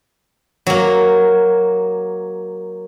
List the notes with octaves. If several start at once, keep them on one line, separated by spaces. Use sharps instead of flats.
F#3 A#3